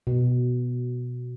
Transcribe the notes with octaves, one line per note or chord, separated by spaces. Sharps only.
B2